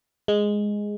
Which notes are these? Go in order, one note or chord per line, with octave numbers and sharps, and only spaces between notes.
G#3